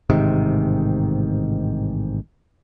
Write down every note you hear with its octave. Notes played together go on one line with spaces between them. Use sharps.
A1 G#2 C3 D#3